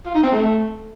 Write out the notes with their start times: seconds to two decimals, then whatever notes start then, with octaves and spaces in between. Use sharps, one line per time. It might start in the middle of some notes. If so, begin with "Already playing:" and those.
0.06 F4
0.14 D#4
0.23 C4
0.32 A3